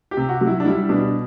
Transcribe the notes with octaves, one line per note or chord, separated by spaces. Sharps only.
G4
C3
F#4
F#3
E4
D4
G3 E4
B2 D4